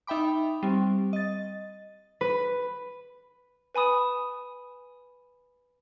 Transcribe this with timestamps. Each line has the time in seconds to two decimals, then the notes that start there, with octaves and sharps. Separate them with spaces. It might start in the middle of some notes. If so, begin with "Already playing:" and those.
0.07 D#4 E5 G5 B5 D6
0.63 G3 C4
1.13 D#5 A6
2.21 B4
3.75 B4 G#5 B5 D#6 E7